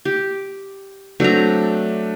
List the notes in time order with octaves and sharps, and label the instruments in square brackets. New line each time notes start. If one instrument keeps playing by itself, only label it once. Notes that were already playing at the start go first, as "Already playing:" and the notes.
[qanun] G4
[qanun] F#3 C4 A#5 [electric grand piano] A3 D4